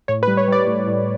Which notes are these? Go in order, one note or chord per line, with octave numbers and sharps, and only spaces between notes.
A2 C#5
B4
G3
C#5
G3 D5
A2
A2